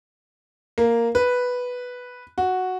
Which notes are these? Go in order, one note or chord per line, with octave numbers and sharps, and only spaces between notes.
A#3
B4
F#4